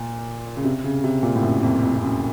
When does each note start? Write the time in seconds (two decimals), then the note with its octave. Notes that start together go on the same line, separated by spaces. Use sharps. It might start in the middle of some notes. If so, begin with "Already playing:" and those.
Already playing: A#2
0.57 C#3
0.64 C3
0.84 C#3
1.04 C3
1.23 A#2
1.36 A2
1.43 F#2
1.63 F2
1.83 F2
1.95 F2
2.02 F#2